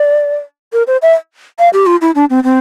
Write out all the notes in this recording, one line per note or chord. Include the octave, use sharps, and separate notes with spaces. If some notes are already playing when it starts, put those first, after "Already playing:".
Already playing: D5
A#4
C5
E5
F5
G4
F4
E4
D4
C4
C4